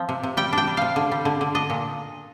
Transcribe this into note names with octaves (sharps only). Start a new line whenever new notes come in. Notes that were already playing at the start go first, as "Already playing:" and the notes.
Already playing: F3 C4
C3
C3
G3 G5
D4 G5
G3
C3 F5
D3
G3
D3
D3
D4 D#5
A#2